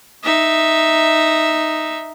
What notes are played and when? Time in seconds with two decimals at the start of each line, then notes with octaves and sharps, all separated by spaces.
0.24 D#4 E5